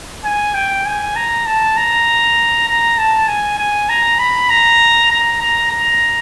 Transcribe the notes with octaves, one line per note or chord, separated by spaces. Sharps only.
G#5
G5
G#5
A#5
A5
A#5
A#5
A5
G#5
G#5
A#5
B5
A#5
A#5
A#5
A#5